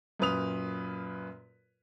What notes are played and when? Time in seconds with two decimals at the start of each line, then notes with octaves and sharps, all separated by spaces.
0.20 F#2 A#2 F4 B4 D#6 F7